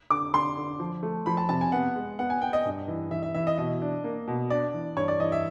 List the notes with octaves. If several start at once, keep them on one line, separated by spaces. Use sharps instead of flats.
D3 D6
D3 C6
D3
F3
A3
F3 B5
A5
C3 A5
G#5
B3 F#5
G#3
B3 F#5
G#5
B3 G5
D#5
G2
E3
E3 E5
E5
E3 E5
D#5
B2 D#5
D4
A#3
B2
D4 D5
E3
G2 C#5
D5
E3 D#5
E5